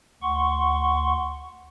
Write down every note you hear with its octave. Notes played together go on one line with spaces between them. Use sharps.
D2 F#5 C6 C#6